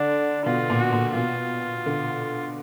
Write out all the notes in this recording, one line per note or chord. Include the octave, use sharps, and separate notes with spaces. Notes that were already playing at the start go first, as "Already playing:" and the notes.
Already playing: D3 D4
B2 F4
A#2
F#4
A#2
B2 F4
D3